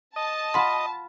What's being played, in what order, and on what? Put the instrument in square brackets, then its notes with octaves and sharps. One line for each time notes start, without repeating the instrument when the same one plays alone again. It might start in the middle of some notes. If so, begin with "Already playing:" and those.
[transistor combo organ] D#5 [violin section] A5
[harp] F4 B5 [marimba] F#5 C6